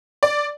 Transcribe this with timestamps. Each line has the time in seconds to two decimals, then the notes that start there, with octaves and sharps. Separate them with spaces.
0.23 D5